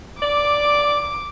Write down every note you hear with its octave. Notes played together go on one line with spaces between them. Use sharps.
D5 D6